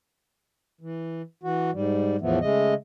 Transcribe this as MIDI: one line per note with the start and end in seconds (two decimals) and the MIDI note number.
0.81 1.22 52
1.43 1.71 52
1.43 1.71 66
1.73 2.16 44
1.73 2.16 55
2.21 2.39 40
2.21 2.39 45
2.21 2.39 52
2.21 2.39 53
2.21 2.39 57
2.21 2.39 59
2.41 2.74 49
2.41 2.74 56
2.41 2.74 57
2.41 2.74 75